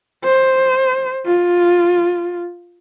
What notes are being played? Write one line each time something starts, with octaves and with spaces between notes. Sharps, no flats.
C5
F4